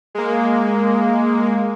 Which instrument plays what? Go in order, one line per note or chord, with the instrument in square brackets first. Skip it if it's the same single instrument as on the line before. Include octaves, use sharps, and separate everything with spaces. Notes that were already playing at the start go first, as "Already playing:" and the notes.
[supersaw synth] G#3 A#3